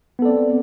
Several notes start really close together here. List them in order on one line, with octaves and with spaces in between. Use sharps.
B3 A4 D5 C4